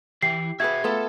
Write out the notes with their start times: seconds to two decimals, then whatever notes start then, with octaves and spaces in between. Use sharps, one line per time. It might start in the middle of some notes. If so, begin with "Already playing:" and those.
0.23 E3 E4 G4 C7
0.60 F#4 G#4 B4 E5 G5 G#6
0.84 A3 B3 F4 A4